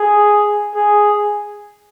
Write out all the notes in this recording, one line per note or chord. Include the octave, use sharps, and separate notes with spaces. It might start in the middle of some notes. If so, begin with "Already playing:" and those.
Already playing: G#4
G#4